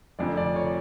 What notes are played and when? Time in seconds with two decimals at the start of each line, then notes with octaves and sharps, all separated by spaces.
0.19 F1 F2 D3 D5
0.37 D5
0.56 C#5